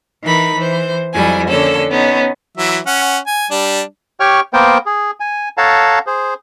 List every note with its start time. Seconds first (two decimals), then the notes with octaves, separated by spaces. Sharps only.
0.23 E3 D#4 A#4 B5
0.55 E3 C5
1.13 F2 F#3 G3 E4 G#5
1.47 D3 A#3 C#4 A4
1.89 B3 C#4 D#4
2.57 E3 F#3 E5
2.86 C#4 F#5
3.27 G#5
3.51 G3 D4
4.20 G4 C#5 G5 C#6 F6
4.53 A#3 B3 A#4 C5 G5
4.86 G#4
5.20 G#5
5.58 A4 C#5 F5 F#5 A5 A#5
6.07 G#4 C5